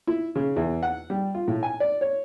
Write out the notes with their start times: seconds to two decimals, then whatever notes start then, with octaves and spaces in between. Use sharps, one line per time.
0.07 E4
0.35 C#3
0.56 E2
0.83 F#5
1.10 G3
1.34 F4
1.48 A2
1.63 G#5
1.80 D5
2.01 C#5